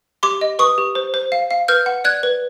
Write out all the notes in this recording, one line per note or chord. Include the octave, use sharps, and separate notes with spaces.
G4 C6 D6
D#5
B4 C#6 D#6
G4
C5
C5
F5
F5
B4 F6 G6
F#5
D5 F#6 G#6
B4